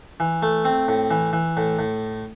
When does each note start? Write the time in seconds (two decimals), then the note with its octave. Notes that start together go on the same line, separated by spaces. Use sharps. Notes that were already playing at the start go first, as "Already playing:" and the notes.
0.20 E3
0.42 A3
0.65 C4
0.88 A2
1.11 E3
1.33 E3
1.57 A2
1.79 A2